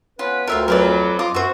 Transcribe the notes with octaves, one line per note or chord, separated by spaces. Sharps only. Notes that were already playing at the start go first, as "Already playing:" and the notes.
B3 C#4 F4 B4
D2 A2 F4 A#4 E5 F5
F2 F#3 A#4 B4 D5
F4 D#5 C6 D6
F#2 F#4 C5 E5